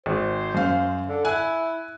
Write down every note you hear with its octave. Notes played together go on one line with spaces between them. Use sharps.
G#1 C5
F#2 F5
D3
E4 G#5 F#6